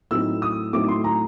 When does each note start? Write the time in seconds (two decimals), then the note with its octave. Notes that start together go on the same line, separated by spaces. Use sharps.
0.11 A2 F#3 A3 C4 D#4 E6
0.42 D#6
0.73 A2 F#3 A3 C4 D#4 D6
0.88 C6
1.04 A#5